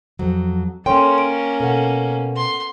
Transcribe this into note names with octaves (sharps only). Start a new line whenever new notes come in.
F2 F#3
A#3 C#4 A4 C#5 G5 C6
D7
B2 A4 F#5
C6